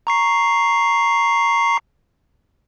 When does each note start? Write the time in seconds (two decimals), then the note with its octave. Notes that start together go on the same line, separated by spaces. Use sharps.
0.07 A#5 C#6 C7